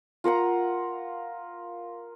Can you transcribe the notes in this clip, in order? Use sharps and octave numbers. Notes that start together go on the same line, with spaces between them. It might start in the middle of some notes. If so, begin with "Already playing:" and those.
F4 A#4 F#5 A#5